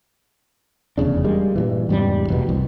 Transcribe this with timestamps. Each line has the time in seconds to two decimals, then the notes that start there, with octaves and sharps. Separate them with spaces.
0.98 F1 E2 C#3 D4
1.24 G3 G#3 A#3
1.56 G2 A#2 E3
1.89 E2 G#2 C#3 G3
2.28 F1 E2 B2
2.49 C2